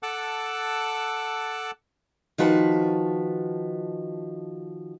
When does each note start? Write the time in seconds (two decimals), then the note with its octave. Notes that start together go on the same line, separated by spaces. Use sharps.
0.03 A4 F#5 A5 D6 E6 F#6
2.38 D#3 F3 F#4 B4 A5